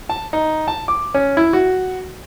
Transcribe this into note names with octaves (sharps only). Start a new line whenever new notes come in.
A5
D#4
A5
D6
C#4
E4
F#4